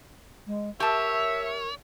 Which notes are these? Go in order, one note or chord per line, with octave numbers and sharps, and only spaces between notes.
G#3
G4 A#4 C#5 E5 A5